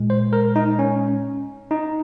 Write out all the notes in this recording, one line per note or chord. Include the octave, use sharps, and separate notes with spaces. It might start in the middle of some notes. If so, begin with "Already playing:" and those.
Already playing: A#2 G#3
C5
A#4
D#4
C#4
D#4